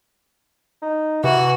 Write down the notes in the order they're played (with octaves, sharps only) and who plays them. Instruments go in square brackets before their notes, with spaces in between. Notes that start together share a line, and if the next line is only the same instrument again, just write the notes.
[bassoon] D#4
[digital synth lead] C3 [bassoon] E3 [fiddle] F#4